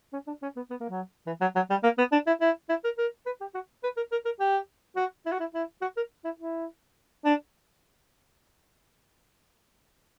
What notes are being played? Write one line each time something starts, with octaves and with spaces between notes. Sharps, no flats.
C#4
D4
C#4
B3
B3
A#3
F#3
E3
F#3
F#3
G3
A#3
B3
D4
E4
E4
E4
A#4
A#4
B4
G4
F#4
B4
A#4
A#4
A#4
G4
F#4
E4
F#4
E4
E4
F#4
A#4
E4
E4
D4